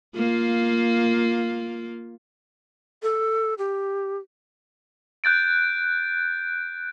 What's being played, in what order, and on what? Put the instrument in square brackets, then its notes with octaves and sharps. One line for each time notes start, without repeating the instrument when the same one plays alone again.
[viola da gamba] A#3 F4
[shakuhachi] A4
G4
[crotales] F#6 G6 A6 D7